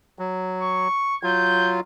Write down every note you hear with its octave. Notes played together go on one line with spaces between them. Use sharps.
F#3
C#6
F#3 F4 G6